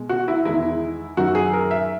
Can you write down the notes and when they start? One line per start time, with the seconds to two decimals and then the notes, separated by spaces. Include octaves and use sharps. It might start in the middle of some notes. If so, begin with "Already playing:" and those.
Already playing: B2 G#3
0.09 F#4
0.28 E4
0.45 E2 D#3 G#3 E4
1.17 F#2 D#3 F#3 F#4
1.35 G#4
1.53 A#4
1.71 E5